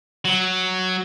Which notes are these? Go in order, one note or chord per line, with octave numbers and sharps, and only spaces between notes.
F#3